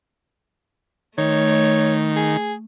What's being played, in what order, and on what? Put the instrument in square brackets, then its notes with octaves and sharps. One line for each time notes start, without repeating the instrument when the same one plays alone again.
[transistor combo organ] D#3 [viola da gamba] A3 [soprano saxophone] C#5
[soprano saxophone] G#4